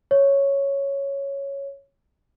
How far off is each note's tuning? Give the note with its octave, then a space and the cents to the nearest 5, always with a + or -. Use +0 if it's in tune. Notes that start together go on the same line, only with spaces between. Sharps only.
C#5 +0